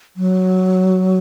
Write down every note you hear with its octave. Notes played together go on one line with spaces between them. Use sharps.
F#3